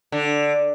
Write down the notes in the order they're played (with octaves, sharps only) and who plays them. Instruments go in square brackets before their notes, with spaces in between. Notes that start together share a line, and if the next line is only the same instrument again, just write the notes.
[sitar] D3